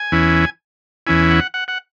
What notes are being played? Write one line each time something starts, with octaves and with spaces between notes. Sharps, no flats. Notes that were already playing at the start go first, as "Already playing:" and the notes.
Already playing: G#5
E2 E3 C#4 E4
E2 E3 C#4 E4 G#5
F#5
F#5
F#5